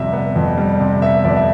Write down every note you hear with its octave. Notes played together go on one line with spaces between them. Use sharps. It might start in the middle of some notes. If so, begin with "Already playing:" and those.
Already playing: F2 C3 G3 B3 E5
B3
F2
G3
C3
B3 E5
F2 D5
E5